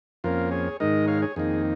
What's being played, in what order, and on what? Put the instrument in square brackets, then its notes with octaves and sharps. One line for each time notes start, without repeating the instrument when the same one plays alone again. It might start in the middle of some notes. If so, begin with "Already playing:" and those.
[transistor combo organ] F2 F3 A#3 C#4 F4 A#4
G#4 C#5
G#2 D#3 G#3 D#4 A#4 D#5
C#5 F5
G#4 C#5
F2 D#3 A#3 D#4 G#4